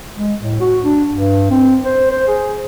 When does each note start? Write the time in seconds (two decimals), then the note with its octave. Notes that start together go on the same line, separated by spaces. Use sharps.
0.16 G#3
0.41 A2
0.60 F#4
0.84 D4
1.13 G2
1.51 C4
1.84 C5
2.11 C5
2.27 G#4